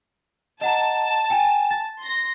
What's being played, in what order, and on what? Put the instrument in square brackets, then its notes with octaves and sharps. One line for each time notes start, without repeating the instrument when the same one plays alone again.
[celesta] D#5 F#5 A#5 [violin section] A5
[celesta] G5 G#5
A6
[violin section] C6 A#6